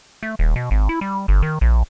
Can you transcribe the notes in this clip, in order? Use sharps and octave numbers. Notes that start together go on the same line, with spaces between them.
A3
D#1
B2
G#1
E4
G3
G1
D#3
A#1